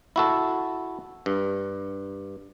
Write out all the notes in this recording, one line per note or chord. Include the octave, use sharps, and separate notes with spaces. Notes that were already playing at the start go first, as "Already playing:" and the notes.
E4 F#4 A4
G2